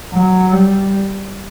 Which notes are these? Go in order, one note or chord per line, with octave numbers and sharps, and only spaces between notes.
F#3
G3